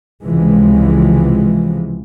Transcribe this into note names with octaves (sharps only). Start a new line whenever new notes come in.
C#2 C3 E3 F3 G#3